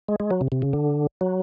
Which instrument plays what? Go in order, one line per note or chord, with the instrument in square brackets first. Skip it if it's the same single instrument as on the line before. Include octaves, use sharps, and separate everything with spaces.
[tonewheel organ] G#3
G#3
F#3
C3
C3
C#3
D3
F#3